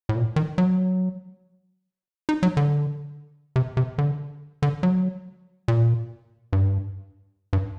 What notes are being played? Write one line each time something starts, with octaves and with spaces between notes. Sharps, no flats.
A2
A#2
D#3
F#3
D#4
F#3
D3
C3
C3
D3
D3
F#3
A#2
G2
G2